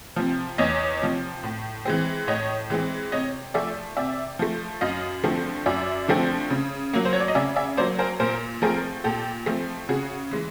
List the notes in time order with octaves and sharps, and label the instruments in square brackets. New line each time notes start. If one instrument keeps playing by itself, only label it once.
[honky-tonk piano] C3 F3
E2 C#5 D#5
C3 F3
A2
E3 G#3 C4
A2 C#5 D#5
E3 G#3 C4
C3 C#5 D#5
F3 A3 D5 E5
C3 D5 E5
F3 A3
F#2 D#5 F5
D3 F3 A3 C4
F#2 D5 E5
D3 F3 A3 C4
C#3
F#3 A#3
C5
C#5
D5
D#5
C#3 D5 E5
D5 E5
F#3 A#3 C5 D5
A#4 C5
A#2 A#4 C5
F3 A3 C4 G#4 A#4
A#2 G4 A4
F3 A3 C4
C#3 F#4 G#4
E3 G#3